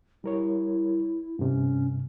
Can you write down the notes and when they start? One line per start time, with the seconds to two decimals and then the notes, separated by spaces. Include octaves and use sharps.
0.24 G3 E4 A#4 C#5
1.39 G2 C3 C#4